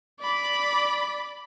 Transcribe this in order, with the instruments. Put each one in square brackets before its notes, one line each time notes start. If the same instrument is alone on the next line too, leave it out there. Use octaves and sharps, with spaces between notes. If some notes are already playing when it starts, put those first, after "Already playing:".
[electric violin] D5 B5